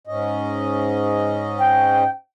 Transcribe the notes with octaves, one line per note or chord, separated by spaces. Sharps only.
G#2 C#4 D#5
G5